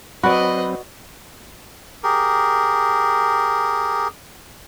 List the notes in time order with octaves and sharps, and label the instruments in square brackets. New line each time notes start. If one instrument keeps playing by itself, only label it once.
[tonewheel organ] F#3 C4 [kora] F#4 D5 [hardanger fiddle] B4 D#5 [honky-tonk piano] B5
[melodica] G4 G#4 A#4